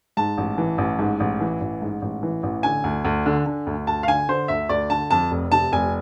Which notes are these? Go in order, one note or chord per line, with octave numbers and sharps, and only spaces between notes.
G#2 A5
A1
E3
A1
G#2
A1
E3
A1
G#2
A1
E3
A1
D3 G#5
D2
D2
D3
D3
D2
D2 A5
F5
D3 G#5
D3 C5
D2 E5
D2 D5
D3 A5
F2 A5
F1
C3 A5
F1 G#5